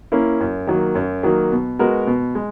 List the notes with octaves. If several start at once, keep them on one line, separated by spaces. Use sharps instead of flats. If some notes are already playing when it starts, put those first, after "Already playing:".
A#3 C#4 E4
F#2
D#3 F#3 A#3
F#2
D#3 F#3 A#3
B2
G#3 B3 F#4 A#4
B2
G#3